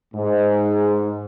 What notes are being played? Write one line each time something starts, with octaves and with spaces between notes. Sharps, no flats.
G#2